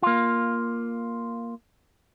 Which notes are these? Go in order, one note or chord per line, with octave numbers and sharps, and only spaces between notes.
A#3 F4